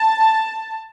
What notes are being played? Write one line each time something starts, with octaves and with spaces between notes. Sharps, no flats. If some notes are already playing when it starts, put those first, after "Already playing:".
Already playing: A5